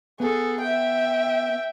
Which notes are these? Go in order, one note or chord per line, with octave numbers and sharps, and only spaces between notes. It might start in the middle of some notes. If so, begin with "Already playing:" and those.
B3 G#4 A4
E5 G5